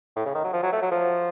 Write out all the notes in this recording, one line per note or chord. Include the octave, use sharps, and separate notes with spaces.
A2
C#3
D#3
F#3
F3
F#3
A3
F#3
F3